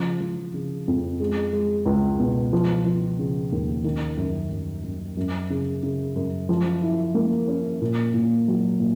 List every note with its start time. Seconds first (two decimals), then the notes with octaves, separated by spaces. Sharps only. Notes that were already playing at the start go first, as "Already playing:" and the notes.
Already playing: C#3 F3
0.20 F3
0.54 C#3
0.88 F2
1.20 G#3
1.53 G#3
1.86 C#2
2.20 B2
2.53 F3
2.85 F3
3.19 C#3
3.52 D#2
3.84 D#3
4.17 F#2
4.51 F#2
4.83 F#2
5.17 F#2
5.50 C#3
5.83 C#3
6.16 F#2
6.49 F3
6.82 E4
7.14 A#3
7.48 C#4
7.81 A#2
8.14 A#2
8.48 F#3
8.80 A#2